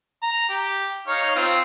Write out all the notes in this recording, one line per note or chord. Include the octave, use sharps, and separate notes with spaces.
A#5
G4
D#4 C#5 F5
C4 F4